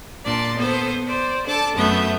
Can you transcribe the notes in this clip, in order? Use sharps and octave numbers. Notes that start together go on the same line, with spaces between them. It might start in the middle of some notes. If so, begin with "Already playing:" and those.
A#2 D4 D5 A5 C6
B3 A4 C5
C5 D5
D4 A4 A5 D6
F#2 A3 B3 E5 G6